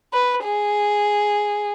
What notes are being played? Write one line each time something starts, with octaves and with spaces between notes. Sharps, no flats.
B4
G#4